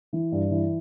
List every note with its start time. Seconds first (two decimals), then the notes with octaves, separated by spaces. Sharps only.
0.13 E3
0.32 G2
0.51 E3